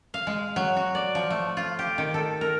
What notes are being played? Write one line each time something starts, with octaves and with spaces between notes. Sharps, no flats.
F5
G#3
F#3
F#4
D5
F3
A3
F4
G4
D#3
A4
A#4